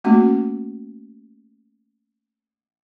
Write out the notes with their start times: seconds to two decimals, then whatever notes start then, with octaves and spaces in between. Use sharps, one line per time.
0.04 A3 A#3 C#4 F#4